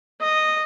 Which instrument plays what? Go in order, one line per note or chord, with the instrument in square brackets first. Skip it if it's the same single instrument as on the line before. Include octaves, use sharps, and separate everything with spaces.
[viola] D#5